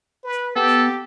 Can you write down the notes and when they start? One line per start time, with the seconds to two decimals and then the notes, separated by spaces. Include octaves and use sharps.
0.23 B4
0.56 B3 G4 A4